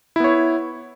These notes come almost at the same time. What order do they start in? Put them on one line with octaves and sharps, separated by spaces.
E4 B3 C#5